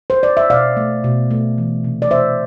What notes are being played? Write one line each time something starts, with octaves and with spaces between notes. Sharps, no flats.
C5
D5
E5
B2 D5 F5
A3
B2
A3
E3
C3
D5
C3 C5 E5